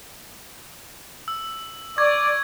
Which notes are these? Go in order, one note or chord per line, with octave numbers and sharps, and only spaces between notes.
E6
D5 C#6 G#6